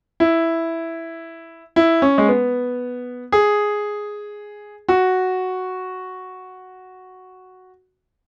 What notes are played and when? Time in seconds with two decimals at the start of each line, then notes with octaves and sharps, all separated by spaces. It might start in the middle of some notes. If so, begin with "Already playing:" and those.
0.20 E4
1.76 E4
2.02 C#4
2.18 G#3
2.29 B3
3.32 G#4
4.89 F#4